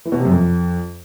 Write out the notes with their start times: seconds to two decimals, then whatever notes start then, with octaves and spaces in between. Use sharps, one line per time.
0.05 E3
0.12 B2
0.18 C3
0.25 F#2
0.31 F2